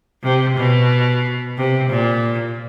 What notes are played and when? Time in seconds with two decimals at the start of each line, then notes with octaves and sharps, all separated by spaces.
0.23 C3
0.56 B2
1.57 C3
1.89 A#2